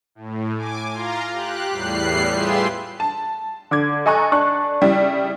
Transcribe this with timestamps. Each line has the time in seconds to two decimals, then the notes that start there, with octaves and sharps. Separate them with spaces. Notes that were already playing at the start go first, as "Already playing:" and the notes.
0.15 A2
0.57 G#5 D6
0.93 F4 F5 A#5 C6
1.33 G4 F#6
1.70 E2 A2 G3 F#6 C7
2.32 F4 G4 G#4 B4 E5 C6
3.00 A5
3.71 D3 D6 G#6
4.06 A4 D#5 G#5 A#5 C#6 F#6
4.32 D4 A5 C#6 F#6
4.81 C#3 G3 E4